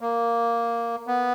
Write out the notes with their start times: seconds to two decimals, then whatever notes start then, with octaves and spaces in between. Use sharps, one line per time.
0.01 A#3
1.07 B3